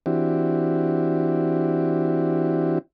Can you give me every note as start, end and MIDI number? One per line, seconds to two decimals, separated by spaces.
0.06 2.79 52
0.06 2.79 60
0.06 2.79 62
0.06 2.79 64
0.06 2.79 66
0.06 2.79 67